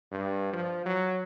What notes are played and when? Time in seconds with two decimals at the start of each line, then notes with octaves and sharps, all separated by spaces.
0.12 G2
0.53 F3
0.86 F#3